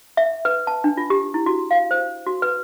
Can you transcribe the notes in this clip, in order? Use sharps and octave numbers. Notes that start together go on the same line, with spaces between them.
E5
B4
A5
D4
F4
G4
E4
F#4
F5
C5
F#4
B4